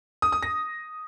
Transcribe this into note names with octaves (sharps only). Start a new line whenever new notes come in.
D#6
D#6
A#6